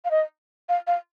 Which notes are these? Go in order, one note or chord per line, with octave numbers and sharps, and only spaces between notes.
F5
D#5
F5
F5